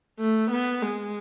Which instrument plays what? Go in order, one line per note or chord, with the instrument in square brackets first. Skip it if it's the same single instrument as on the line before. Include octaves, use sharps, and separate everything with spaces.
[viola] A3
B3
G#3